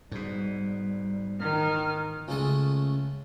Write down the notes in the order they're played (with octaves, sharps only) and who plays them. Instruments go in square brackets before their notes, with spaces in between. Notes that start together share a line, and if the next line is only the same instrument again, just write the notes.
[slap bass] G#2 B2 [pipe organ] G3
[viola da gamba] D#3 [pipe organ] F6
[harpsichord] C#2 C#3 G#3 A3 A5